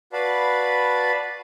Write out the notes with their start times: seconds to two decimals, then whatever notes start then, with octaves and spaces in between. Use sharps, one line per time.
0.13 F#4 B4 D5 F5 A5 B5